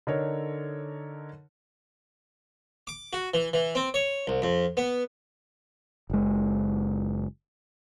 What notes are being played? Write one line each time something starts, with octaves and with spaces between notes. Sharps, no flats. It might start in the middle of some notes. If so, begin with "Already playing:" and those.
D3 D#4 A4 A#4 C#5
D6
F#4
E3
E3
C4
C#5
C2
F2
B3
F#1 G#3